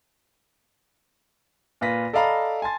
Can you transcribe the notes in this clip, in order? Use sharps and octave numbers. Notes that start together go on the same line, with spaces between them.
A#2 F4 B4 A#6 B6
A4 D5 D#5 F5 A#5 B5
G#5 A5 C6 A6